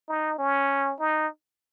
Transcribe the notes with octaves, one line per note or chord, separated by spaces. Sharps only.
D#4
C#4
D#4